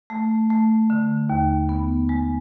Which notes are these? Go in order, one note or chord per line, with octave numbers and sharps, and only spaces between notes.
A3
A3
D3
D#2
B3
G#3